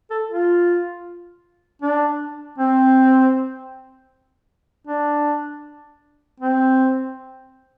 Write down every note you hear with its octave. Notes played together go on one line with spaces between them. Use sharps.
A4
F4
D4
C4
D4
C4